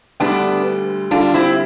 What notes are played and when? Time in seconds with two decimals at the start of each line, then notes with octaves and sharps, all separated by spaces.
0.20 D2 D3 G3 B3 D4
1.11 D2 D3 G3 D4 F4
1.34 C4 E4